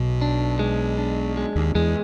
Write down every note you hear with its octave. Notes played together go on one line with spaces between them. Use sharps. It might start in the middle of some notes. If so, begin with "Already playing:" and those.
Already playing: B1 B2
D4
G#3
D4
G#3
D#2 D#3
E2 E3 G#3